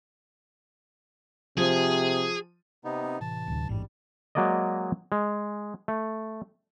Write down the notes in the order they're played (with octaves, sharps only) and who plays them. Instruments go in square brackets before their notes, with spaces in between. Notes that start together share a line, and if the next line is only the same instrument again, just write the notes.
[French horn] C3 [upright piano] F3 [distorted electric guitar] G#4
[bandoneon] C3 B3 D#4
[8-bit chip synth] C4
[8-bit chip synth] A2 C3 E3 [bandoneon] A5
[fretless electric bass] D1 D2
[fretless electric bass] A1 G#2 [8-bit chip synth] F2 [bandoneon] G3
[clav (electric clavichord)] F#3 G#3 A#3 D5 D#5
G#3
A3